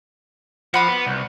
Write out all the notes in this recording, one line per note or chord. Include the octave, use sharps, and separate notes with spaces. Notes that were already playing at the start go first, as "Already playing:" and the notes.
F3 F#5 B5 D6
B3
C2